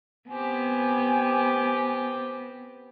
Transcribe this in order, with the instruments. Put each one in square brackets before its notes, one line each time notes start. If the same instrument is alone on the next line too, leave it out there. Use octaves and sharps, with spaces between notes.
[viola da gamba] B3 [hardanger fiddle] C4 G4 [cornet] G#5